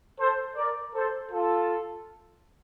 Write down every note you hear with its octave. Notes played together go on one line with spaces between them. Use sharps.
A4 C5
A#4 D5
A4 C5
F4 A4